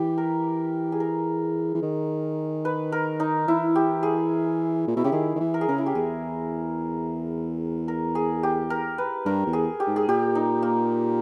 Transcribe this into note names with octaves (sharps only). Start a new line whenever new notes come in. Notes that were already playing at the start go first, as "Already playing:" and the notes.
Already playing: E3 G4
A#4
G#4
A#4
E3
D#3
B4
A#4
D#4
E3 E4
G4
G#4
A#2
B2 E4
C#3 G4
D#3 G#4
D#3
E3
A#4
G#4
C#3 A#4
E4
G4
E2 G#4
A#4
G#4
G4
A#4
B4
G2 A#4
E2
G#4
G4
G#2
G#4
A#2 G4
D#4
A#3